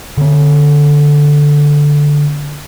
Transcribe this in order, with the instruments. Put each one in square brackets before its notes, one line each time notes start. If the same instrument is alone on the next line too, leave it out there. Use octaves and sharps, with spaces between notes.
[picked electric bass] D3 C4